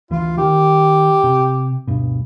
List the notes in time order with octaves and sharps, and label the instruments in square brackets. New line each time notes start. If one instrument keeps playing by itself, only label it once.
[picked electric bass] D2 E3 [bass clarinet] F4
[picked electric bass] D#3 [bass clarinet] G4
[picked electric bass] C3
D2 G2 B2